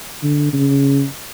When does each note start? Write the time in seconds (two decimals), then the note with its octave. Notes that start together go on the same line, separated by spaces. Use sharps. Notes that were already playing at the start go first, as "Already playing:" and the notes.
0.23 D3
0.53 C#3